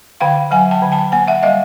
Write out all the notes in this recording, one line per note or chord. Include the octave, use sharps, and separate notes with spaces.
D3 F5 G5
F#3 F#5 G#5
G5 A5
D3
G5 A5
A#3 F#5 G#5
E5 F#5
G3 D#5 F5